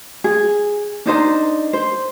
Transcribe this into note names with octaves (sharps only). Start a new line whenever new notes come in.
G#4
D4 D#4 C5 A#5
C5